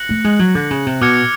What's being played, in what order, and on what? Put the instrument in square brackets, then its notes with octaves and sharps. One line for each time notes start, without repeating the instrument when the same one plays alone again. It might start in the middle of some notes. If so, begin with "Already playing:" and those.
Already playing: [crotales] F#6 A#6 C#7 F#7
[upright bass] A3
G#3
F#3
D3
C#3
C3
[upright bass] B2 [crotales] D6 F6 G#6 C#7